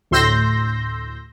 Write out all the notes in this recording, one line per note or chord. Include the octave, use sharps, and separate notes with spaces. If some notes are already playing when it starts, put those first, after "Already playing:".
D2 A2 C6 E6 G6 A#6